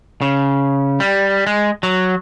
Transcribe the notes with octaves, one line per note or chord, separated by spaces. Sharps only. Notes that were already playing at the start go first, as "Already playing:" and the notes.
C#3
G3
G#3
F#3